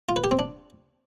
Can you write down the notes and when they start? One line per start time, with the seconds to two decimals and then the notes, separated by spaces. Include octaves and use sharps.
0.09 F4
0.16 B4
0.24 G4
0.31 C4
0.39 D4